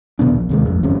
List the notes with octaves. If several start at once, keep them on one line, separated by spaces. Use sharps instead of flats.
D#2 B2 B3 D4
A#1
D#2 C3 G#3
A1 F2
G1 F#2 C#3 C4